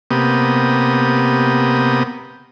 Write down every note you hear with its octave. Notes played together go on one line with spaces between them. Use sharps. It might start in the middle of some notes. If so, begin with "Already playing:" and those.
C3 A#3 B3 G4 D#6